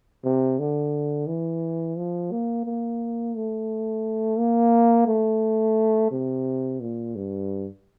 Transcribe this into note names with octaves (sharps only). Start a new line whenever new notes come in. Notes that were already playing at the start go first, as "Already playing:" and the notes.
C3
D3
E3
F3
A#3
A#3
A3
A#3
A3
C3
A#2
G2